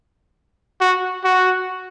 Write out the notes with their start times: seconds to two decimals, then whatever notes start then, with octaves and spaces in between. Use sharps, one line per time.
0.81 F#4
1.24 F#4